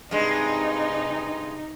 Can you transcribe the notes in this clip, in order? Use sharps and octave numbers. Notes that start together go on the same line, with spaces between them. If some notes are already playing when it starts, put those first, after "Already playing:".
G2 C3 G#3 D#4